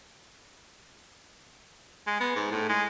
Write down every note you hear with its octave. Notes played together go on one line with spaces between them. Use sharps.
G#3
B3
G#2
A2
G#3